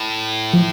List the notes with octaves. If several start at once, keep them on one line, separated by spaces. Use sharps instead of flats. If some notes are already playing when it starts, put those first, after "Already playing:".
Already playing: A2
F3